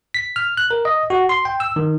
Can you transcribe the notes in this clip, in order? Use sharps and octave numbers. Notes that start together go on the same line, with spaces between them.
B6
F6
F#6
A#4
D#5
F#4
C6
G5
E6
D#3